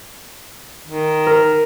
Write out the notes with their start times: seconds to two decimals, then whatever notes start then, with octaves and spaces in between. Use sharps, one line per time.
0.87 D#3
1.27 A#4